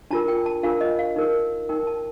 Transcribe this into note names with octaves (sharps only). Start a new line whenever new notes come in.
D4 F4 A#4 A5
G5
A5
D4 F4 A#4 F5
D#5
F5
D#4 A#4
D#4 A#4 G5
A5